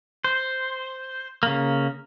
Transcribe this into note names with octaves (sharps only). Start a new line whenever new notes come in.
C5
C#3 A#3